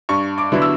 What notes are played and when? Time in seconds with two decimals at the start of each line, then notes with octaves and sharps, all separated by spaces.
0.09 G2 C#6
0.38 D6
0.52 D3 F#3 B3 E4
0.62 E6